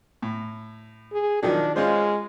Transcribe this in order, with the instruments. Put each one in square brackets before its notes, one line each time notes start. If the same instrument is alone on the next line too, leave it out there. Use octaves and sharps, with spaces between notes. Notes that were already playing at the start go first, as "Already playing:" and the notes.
[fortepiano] A2
[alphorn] G#4
[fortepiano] D#3 F3 F#3 [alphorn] D4
[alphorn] G#3 [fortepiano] C#4 F4 C5